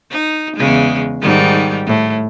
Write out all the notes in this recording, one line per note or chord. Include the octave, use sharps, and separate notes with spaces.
D#4
E2 C#3 G#3
G#2 D#3 G3
A2